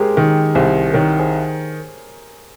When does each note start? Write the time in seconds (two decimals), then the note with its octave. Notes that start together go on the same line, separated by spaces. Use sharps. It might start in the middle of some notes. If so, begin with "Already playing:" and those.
Already playing: G#3 G4 G#4 A#4 C5
0.17 D#3
0.55 C2 G#4 C5
0.93 D#3 A#4 C#5
1.19 G#4 C5